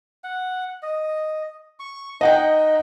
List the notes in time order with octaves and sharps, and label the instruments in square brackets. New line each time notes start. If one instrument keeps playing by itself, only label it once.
[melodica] F#5
D#5
C#6
[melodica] D#4 [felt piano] D#5 F#5 G5